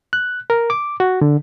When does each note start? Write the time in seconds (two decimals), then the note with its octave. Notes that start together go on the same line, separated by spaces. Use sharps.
0.13 F#6
0.50 A#4
0.70 D6
1.00 F#4
1.21 D3